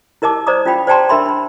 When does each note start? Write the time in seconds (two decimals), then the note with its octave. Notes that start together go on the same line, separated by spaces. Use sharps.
0.22 E4 A#4 D#5 A5 D6
0.47 C5 D5 D#5 A#5 D6 D#6
0.66 C#4 F4 F5 G5 B5
0.87 C5 D5 G5 A5 A#5 C6
1.09 D4 A#4 E5 B5 C6
1.26 D4 B5